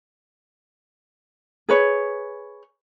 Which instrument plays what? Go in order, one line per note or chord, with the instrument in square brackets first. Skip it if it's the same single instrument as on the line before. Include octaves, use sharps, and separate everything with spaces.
[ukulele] G#4 B4 C#5